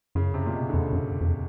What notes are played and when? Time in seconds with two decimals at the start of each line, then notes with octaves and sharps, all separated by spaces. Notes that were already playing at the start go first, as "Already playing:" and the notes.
0.15 F#2 C#3
0.34 C3
0.46 A#2
0.54 B2
0.69 D3
0.74 F2 C#3
0.93 F#2
1.21 F2